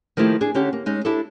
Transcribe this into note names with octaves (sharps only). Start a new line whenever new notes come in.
D#3 F3 A3 A#3 E4 G4
D4 G#4
D3 C#4 G4
A#3
G#3 C#4 D#4
D4 E4 G4 A4